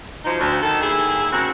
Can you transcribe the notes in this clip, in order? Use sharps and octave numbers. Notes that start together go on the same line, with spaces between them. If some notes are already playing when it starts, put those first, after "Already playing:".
F3 F#3 D#4
D2
D#3 A4
D#2 E4 G#4
C#3 C4 F#4 A#4